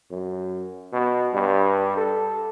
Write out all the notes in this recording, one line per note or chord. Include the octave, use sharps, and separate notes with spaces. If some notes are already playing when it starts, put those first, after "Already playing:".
F#2
B2
G2
A4